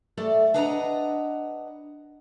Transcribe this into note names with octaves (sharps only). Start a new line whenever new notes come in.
A3 A4 D5
D4 B4 D#5 F#5 G5 A#5